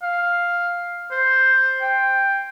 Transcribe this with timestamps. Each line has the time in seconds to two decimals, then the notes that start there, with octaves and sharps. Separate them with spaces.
0.03 F5
1.11 C5
1.82 G5